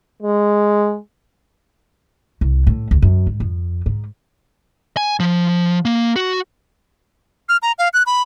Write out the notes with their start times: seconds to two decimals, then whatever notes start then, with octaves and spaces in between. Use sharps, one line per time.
0.22 G#3
2.41 C2
2.67 A2
2.91 D2
3.02 F#2
3.27 G#2
3.40 F2
3.86 G#2
4.97 G#5
5.20 F3
5.85 A#3
6.16 F#4
7.49 F6
7.62 A#5
7.79 F5
7.94 F#6
8.06 B5